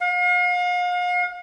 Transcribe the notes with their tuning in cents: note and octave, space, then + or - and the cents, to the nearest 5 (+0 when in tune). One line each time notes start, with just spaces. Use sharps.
F5 +40